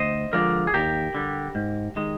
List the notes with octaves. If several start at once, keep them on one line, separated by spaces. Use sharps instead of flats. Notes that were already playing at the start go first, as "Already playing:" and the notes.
Already playing: D2 C5 D#5
D3 F3 G#3 A#4 D5
G#4
D#2 G4 A#4
D3 G3
G#2
D#3 G#3